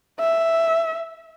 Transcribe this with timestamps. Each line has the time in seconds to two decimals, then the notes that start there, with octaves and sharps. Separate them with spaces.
0.19 E5